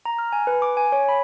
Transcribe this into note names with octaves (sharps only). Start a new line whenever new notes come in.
A#5
F6
G#5
B4
D6
G#5
C#5
B5